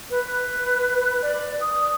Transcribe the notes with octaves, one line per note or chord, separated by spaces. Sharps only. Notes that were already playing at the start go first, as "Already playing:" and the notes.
B4
D5
D#6